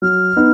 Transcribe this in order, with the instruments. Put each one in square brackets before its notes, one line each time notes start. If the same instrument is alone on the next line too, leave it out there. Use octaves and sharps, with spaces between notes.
[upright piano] F#3 [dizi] F6
[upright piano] B3 D#4